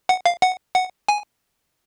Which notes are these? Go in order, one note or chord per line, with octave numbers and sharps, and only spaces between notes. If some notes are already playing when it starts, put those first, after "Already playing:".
F#5
F5
F#5
F#5
G#5